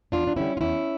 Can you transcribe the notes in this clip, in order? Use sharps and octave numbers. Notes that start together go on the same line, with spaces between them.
E2 D4 F4
D4
D3 G3 C#4 E4
F4
E2 C#4 E4